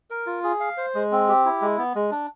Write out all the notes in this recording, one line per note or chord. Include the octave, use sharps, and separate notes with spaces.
A#4
F4
G#4
F5
C5
G#3
C4
G4
E4
G#3
B3
G#3
D4